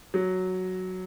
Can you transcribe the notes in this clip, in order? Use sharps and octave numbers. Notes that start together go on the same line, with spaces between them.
F#3